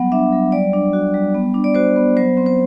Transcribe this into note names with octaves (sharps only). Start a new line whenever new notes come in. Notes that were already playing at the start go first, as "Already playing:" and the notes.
Already playing: F#3 G3 B3 F#5
D4 E5
F#3
G3 D5
D4
F#4
G3
B3
D4
D5
F#4 C5
B3
F#3 C5
C4
C5